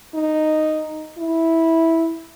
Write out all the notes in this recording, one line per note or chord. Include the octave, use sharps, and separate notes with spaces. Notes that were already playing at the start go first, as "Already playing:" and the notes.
D#4
E4